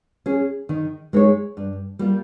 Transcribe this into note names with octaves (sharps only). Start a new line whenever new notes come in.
C#4 G#4
D#3
G#3 D#4 A#4 C#5
G2
G3 A#3 F4